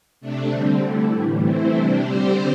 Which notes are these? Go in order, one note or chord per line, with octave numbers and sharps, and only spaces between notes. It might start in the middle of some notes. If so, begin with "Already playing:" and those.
C3 A3 D4
D3 G3 C4
D3 A3 E4
A2 E3 G3
E3 A3 C4 E4 C5
C3 G3 D4
D3 G3 C4 G4 C5